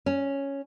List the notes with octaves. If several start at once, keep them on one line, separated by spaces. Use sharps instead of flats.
C#4